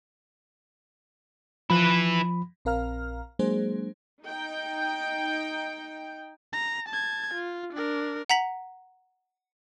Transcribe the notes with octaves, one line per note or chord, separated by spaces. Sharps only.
F3 E4 B4 B5
A#1 C4 A#4 F5 A#5 F6
F#3 G#3 A#3 D4 G#4 C5
D#4 G5
A#5
A5 G#6
F4
D4 A#4
F#5 A#5 B6 F#7